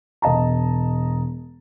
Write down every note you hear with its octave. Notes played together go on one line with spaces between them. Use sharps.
E1 D#5 A5 A#5